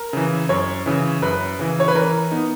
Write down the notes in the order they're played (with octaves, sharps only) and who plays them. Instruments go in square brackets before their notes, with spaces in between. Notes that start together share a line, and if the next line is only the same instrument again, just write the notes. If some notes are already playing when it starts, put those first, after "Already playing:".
Already playing: [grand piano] A#4
[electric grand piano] C#3 E3
[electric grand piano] F#2 [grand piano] C#5
[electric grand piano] C#3 E3
[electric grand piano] F#2 [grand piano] B4
[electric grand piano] C#3 E3
[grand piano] C#5
B4
[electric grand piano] E3 [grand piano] A#4
[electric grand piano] B3 D#4